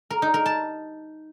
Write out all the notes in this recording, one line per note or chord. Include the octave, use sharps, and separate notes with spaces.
A#4
D#4
A#4
A5